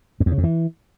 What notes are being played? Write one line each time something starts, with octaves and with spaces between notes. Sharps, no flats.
F#2
E2
C#3
F2
E3